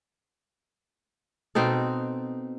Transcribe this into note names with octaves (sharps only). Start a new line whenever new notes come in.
B2 C4 D#4 A4